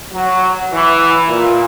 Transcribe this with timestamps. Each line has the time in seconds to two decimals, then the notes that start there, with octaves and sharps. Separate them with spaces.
0.12 F#3
0.72 E3
1.27 A#2